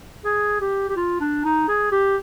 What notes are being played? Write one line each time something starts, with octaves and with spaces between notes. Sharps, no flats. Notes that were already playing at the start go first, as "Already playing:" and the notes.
G#4
G4
G4
F4
D4
D#4
G#4
G4